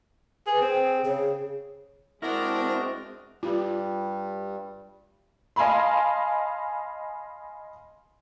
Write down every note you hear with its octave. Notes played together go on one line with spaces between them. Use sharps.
G#4 B4
C4 G#4
C#3 G#4
G#3 C4 D4 E4 F#4 A#4 D#5
G2 G3 F4
D#5 F5 G#5 A5 B5 C6